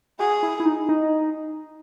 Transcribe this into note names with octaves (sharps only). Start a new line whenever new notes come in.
F#4 G#4
E4
E4
D#4
D#4